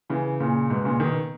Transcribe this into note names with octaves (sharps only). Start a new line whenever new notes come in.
C#3 E3
A#2 C#3
G#2 B2
A#2 C#3
B2 D#3